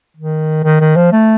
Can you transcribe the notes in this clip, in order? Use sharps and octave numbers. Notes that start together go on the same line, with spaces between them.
D#3
D#3
D#3
F3
A3